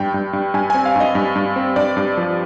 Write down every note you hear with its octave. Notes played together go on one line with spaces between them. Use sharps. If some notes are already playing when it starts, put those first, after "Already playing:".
Already playing: G2 G5
G2
G2
G2 G#5
C4 G#5
F5
G2 D#5
G2
G2
C4
G2 D5
G2
F3